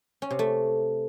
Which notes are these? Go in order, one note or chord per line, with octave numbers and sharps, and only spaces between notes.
C#4
C3
A3